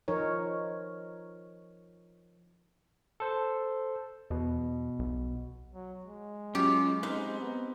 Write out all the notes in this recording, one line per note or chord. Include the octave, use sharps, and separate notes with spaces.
F3 D#4 A#4 C#5
A4 C5
E2 B2
B1
F#3
G#3
F#3 C#4 F4 G4
C4 D#4 B4 F5
B3